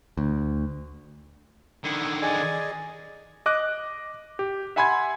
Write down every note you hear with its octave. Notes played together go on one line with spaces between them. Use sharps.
D2
D3 D#3 E4
G#4 D5 D#5 G#5
D#5 D6 F#6
G4
E5 F#5 G#5 B5 C6 G#6